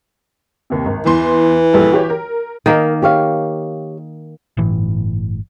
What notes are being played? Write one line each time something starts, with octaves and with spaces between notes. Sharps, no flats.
D#2 C3
G#1
E2 E3 B3 C6
A#1 G3 A4
F#4 G4 C#5
A#4
D#3 A#3 A#4 D#5
G4 C#5 F5
G1 A2 E3